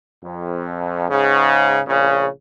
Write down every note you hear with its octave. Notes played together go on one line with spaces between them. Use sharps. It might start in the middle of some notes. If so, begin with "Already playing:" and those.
F2
G#2 C#3
A#1 C#3